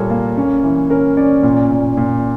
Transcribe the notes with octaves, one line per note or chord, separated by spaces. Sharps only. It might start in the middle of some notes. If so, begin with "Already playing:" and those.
Already playing: A#2 G3 A#3 A4 A#4 C#5
A#3
C#4
E3
C#4 A#4
C#4 D5
A#2
A#2
A#2